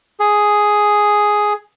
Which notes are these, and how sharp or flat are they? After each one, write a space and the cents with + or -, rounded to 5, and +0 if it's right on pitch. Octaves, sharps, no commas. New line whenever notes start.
G#4 +5